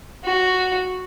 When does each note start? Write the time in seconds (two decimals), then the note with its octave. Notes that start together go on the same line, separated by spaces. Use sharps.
0.24 F#4